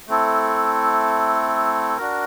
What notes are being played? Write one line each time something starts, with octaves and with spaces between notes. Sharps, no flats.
A3 C4 E4 A4
D4 F#4 A#4